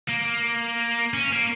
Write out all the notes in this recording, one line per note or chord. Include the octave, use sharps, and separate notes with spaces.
A#3
C#4
A#3